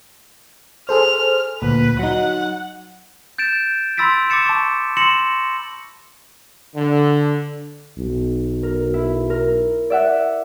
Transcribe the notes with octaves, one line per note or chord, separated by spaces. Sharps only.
G#4 A4 C5 F6
D2 A#2 B4
F#3 D#4 F#5
G6 A6 D7 E7
B5 C6 E6 A6 B6 D7
D6 E6 A6 C#7 E7
A5 C#6
C6 E6 A#6 C#7 E7 F#7
D3
B1
A#4
E4
A#4
D5 E5 F#5